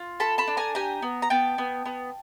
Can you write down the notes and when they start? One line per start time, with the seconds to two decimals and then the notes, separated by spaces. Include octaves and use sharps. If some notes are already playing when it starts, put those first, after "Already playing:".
Already playing: F4
0.20 A4 A5 B5
0.38 A5 B5
0.47 D4
0.57 G#5 A#5
0.75 G4 G#5 A#5
1.02 B3
1.22 A#5
1.30 B3 G5 A5
1.58 B3
1.86 B3